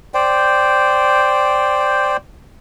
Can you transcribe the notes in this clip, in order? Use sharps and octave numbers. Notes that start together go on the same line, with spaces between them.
C5 D5 G5